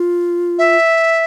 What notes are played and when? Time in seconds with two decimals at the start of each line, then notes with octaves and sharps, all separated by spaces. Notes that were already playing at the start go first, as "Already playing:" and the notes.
Already playing: F4
0.59 E5